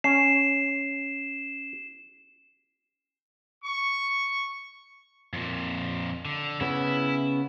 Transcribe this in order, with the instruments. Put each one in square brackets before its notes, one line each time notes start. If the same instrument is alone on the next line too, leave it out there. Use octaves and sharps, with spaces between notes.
[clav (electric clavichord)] C#4 [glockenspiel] C7 [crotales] E7
[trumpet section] C#6
[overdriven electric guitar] F2 A#2
D3
[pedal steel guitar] C#3 B3 C#4 [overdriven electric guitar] E4